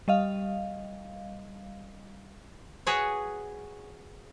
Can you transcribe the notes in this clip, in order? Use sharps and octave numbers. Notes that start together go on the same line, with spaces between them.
G3 D#5 F5
F#4 G#4 B4 C#5 G#5